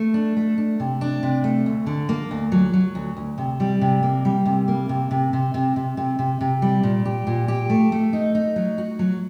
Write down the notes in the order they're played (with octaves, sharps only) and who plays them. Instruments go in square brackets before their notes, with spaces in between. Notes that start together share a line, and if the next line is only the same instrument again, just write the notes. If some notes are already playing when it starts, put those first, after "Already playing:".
Already playing: [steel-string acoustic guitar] A3
D4
A3
D4
C3
D4
C3
A3
D2
D3
A#3
D2
F#3
F#3
D2
D2
C3
G3
C3
A#3
G3
C3
A#3
C3
C3
C3
C3
C3
C3
C3
C3
G3
A#2
G4
A#2
G4
A3
A3
D#4
D#4
F#3
F#4
F#3